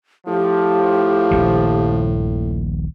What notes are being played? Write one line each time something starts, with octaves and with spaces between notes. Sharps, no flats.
A2 F3 G4
D#1 A#1 D#3